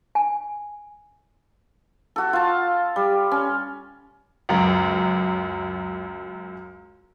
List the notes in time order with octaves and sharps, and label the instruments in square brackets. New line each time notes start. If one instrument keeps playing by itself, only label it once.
[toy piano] G#5
[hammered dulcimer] F#4 A4
F4 A5
G3
C#4
[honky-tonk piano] C#2 F#2